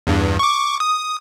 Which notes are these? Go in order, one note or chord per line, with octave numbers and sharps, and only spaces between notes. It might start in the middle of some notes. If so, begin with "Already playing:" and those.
E2 G2
C#6 D6
D#6